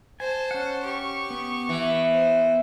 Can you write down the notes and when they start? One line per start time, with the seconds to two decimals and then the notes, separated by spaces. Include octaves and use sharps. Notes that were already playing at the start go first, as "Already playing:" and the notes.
0.20 C5 G#5 A5
0.51 C#4 F#5
0.84 G4 C#6
1.30 B3
1.69 E3
2.11 C5